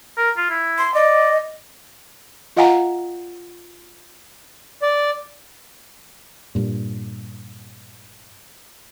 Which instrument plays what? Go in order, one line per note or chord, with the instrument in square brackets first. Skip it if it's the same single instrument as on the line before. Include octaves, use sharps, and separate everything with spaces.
[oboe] A#4
F4
E4
[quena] C6
[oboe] D5 [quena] D#5
[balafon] F4 D#5 F5 F#5 G#5 A#5
[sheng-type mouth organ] D5
[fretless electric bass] G2 A#2